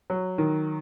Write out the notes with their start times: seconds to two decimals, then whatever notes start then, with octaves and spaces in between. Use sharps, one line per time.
0.10 F#3
0.38 D#3